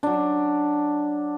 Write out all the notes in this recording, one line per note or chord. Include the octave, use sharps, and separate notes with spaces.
F#3 D4